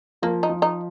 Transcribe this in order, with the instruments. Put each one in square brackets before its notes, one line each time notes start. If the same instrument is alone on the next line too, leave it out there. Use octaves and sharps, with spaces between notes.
[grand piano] F3 [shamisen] A#3
[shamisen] D#4
[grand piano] F3
[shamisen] D#4